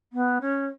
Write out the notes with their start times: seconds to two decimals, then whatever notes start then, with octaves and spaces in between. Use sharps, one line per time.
0.13 B3
0.41 C#4